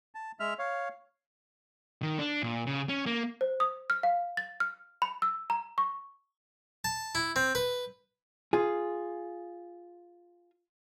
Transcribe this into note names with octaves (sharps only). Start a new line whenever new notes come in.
A5
G#3 E5 F6
C#5 F5
D#3
D4
A#2
C#3
C#4
A#3
C5
D#6
F6
F5
A6
F6
B5
E6
A#5
C#6
A5
E4
C4
B4
F4 G#4